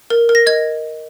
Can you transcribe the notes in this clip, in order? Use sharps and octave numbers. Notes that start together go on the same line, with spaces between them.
A#4
A#4
A#6
D#5 G#6